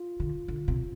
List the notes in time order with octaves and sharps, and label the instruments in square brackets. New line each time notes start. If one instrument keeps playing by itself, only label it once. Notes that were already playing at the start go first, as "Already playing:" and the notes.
Already playing: [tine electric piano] F4
[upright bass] D3
D3
C3